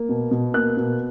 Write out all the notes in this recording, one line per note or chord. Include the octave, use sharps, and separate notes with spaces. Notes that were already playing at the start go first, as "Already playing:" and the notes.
Already playing: A#3
B2
B2
A#3 F#6
B2